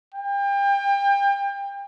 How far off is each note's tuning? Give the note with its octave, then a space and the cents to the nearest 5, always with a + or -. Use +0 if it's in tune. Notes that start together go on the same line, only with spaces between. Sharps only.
G5 +30